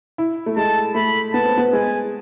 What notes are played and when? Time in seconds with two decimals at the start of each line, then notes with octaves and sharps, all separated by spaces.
0.18 E4
0.46 A3
0.57 G#3 A5
0.95 A3 B5
1.34 B3 A5
1.45 C4
1.57 B3
1.73 G#3 G#5